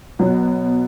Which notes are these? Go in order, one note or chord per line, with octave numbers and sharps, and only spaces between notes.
B2 F#3 B3